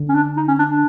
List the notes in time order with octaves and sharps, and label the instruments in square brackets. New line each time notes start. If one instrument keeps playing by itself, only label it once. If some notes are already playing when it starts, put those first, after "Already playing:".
Already playing: [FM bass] D3
[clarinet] C#4
D4
D#4
C#4
D4
D4